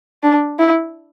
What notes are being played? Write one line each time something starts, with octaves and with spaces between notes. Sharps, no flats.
D4
E4